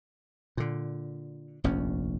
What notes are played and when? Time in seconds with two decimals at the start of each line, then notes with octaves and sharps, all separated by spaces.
0.57 A#2 D3
1.64 F1 A#1 D#2 C#4